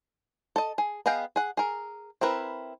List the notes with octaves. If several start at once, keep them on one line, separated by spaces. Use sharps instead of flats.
A4 D#5
G#4
B3 G#4 D#5 F5 G5
G#4 F#5
G#4 A#4
C4 E4 A#4 B4